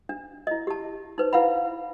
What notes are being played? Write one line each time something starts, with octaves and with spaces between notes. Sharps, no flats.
D4
E4 D#5
G4 A5
D#4 B4 C5
E4 B4 F5 F#5 B5